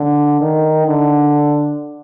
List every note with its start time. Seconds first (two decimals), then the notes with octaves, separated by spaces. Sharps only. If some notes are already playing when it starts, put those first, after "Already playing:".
Already playing: D3
0.41 D#3
0.87 D3